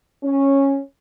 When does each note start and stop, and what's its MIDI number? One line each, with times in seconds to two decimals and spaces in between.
0.24 0.79 61